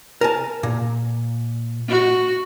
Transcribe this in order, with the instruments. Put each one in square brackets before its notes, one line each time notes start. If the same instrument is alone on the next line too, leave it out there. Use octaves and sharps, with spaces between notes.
[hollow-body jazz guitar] A#4 G#5 A5
A#2
[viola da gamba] F#4